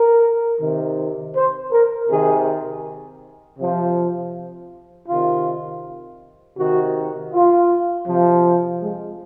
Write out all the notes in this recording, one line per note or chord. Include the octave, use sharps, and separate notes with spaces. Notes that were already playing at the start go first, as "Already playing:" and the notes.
Already playing: A#4
C3 D#3
C5
A#4
C3 D#3 G#4
C3 F3
C3 D#3 F4
C3 D#3 F#4
F4
C3 F3
G#3